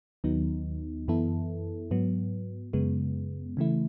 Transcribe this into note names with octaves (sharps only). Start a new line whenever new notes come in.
D#2 D#3 F#3 B3 D#4
F#2 E3 B3 E4 A4
G#2 F#3 B3
F#2 C#3 G#3 B3
C#3 E3 A3 E4